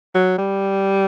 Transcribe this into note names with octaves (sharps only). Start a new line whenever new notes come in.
F#3
G3